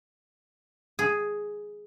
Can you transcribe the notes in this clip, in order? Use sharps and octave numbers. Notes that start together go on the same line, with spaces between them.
G#4